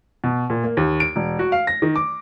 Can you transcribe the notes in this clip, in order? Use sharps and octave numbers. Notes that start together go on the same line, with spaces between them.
B2
A#2
A#3
D#2
D7
E1
F#4
F5
A#6
D#3
D6